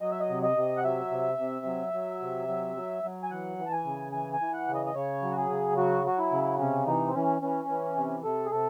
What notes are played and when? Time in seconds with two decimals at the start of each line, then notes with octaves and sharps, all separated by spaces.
0.01 F#3 D#5
0.11 E5
0.20 D#5
0.29 C3
0.43 D#5
0.57 C3
0.77 F#5
0.84 F#3 E5
1.11 C3
1.38 C3
1.66 F#3
1.93 F#3
2.21 C3
2.48 F#3
2.76 F#3
3.03 F#3
3.23 G#5
3.31 E3 F#5
3.58 E3
3.66 A5
3.72 G#5
3.85 C#3
4.12 E3 G#5
4.33 G#5
4.40 E3
4.53 F#5
4.68 C#3
4.75 D#5
4.86 D#5
4.94 C#3 C#5
5.22 F#3
5.31 F#4
5.37 G#4
5.50 C#3
5.77 F#3 F#4
6.04 F#3 F#4
6.18 E4
6.32 C#3
6.59 C3 C#4
6.86 E3 D#4
7.07 C4
7.14 E3 C#4
7.42 E3 C#4
7.69 E3
7.97 C3
8.23 C3 A4
8.46 G#4
8.51 C3 A4